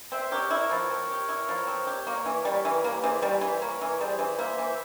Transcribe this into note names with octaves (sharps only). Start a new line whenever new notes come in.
C4 C5 E5
E5
G4 A#4 C#5
E4
F3
C4
G4
E4
F3
C4
G4
A#3 A#4 C#5
E3
G3 A#4 C#5
E3
A#3 G4 A#4
E3 G#4 C5
G3 A#4 C#5
C#5
E3 C5 E5
A#3 A#4 C#5
E3
C#5
G3 G#4 C5
E3
A#3 C5 E5
E3